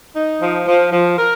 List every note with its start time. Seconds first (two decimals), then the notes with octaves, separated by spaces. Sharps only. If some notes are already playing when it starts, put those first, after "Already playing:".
0.15 D#4
0.41 F3
0.67 F3
0.92 F3
1.18 A#4